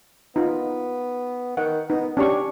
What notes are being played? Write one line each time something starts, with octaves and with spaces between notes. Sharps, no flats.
B3 D#4 F4
D#3 F#5
B3 D#4
C#4 D4 G4 C#6